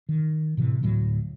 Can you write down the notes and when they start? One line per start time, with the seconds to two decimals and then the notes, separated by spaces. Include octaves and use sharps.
0.09 D#3
0.57 A2 C3 E3
0.83 D2 A2 F#3